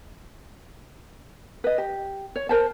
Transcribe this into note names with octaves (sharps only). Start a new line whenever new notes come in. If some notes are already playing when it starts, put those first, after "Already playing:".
B4 D#5
G4
C#5
A#4 C5 A5